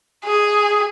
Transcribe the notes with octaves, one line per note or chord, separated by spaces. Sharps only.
G#4